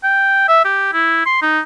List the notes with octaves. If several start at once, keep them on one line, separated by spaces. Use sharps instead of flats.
G5
E5
G4
E4
C6
D#4